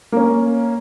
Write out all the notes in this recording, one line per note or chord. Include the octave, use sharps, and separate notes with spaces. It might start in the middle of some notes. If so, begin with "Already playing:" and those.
A#3 C#4